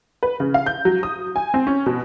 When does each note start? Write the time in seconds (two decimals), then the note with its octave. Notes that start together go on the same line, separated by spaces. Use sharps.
0.23 B4
0.40 C#3
0.54 F5
0.66 G6
0.85 F#3
1.03 D#6
1.36 G#5
1.54 C4
1.67 C#4
1.86 B2